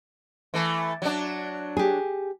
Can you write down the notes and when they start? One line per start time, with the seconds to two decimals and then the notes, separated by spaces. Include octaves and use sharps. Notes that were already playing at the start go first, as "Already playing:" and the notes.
0.54 E3 A3
1.02 F#3 D4
1.77 G4 G#4